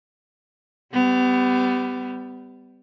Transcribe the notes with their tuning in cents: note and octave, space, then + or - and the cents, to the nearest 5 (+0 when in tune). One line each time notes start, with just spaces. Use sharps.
G3 +0 B3 +30